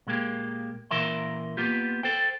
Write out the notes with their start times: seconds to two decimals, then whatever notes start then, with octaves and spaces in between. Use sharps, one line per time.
0.07 A#2 G#3 A#3 G4
0.91 A#2 E3 A#4 E5 C6
1.57 A#3 B3 F4 G4
2.03 A4 C5 G5